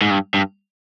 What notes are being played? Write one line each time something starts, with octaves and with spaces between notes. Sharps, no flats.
G#2
G2
G2